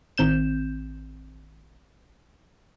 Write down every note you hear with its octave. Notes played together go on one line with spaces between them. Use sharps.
A1 D#3 C4 G6 E7